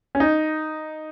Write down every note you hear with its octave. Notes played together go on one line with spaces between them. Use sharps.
C#4
D#4